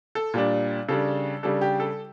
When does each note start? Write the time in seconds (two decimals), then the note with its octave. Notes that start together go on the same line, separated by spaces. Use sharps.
0.15 A4
0.34 A#2 G3 D4
0.88 C#3 G3 D4 A4
1.43 C#3 G3 D4 A4
1.61 G4
1.80 A4